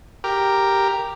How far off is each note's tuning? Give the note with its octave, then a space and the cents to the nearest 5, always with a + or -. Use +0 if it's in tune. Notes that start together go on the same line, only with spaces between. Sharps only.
G4 +0 A#4 +0